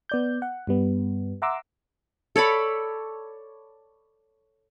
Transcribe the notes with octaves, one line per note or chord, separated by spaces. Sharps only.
B3 D5 G6
F#5
G2 G3 B3
E5 F#5 A#5 C6 D6 E6
A4 C#5 D5 B5